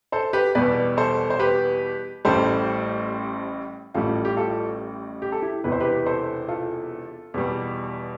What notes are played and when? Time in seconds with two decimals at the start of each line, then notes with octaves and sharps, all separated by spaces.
0.12 A4 C5
0.33 G4 B4
0.55 E2 B2 G3 B4 D5
0.97 A4 C5
1.30 C5
1.39 G4 B4
2.25 A1 A2 G3 A4 C5
3.94 A1 A2 G3 F4 A4
4.25 G4
4.37 F4 A4
5.22 G4
5.32 A4
5.42 E4 G4
5.64 E1 E2 C3 E3 B4
5.72 C5
5.80 G4 B4
6.06 A4 C5
6.48 F4 A4
7.34 E2 B2 G3